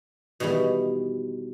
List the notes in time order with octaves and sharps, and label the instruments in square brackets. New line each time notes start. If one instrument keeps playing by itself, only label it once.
[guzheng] B2 D#3 E3 G3 B3